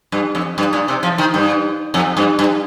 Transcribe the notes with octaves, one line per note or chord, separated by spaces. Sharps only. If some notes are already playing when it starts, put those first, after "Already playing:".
G2
F2
G2
A#2
C3
F3
D#3
G2
F2
G2
G2